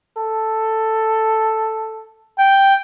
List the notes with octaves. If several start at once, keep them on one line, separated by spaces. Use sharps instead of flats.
A4
G5